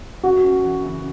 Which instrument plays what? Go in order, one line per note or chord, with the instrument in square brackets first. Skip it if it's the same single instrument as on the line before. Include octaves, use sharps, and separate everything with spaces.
[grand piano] F#2 [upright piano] F#4
[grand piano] C#4
E3
C#3